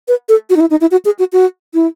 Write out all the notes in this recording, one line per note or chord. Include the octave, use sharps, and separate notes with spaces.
B4
A4
F#4
D#4
E4
D#4
E4
F#4
G#4
F#4
F#4
E4